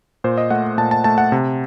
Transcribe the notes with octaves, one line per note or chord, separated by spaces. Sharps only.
A#2 C5
D#5
A3 F#5
A#2 A5
A5
A3 A5
F#5
C3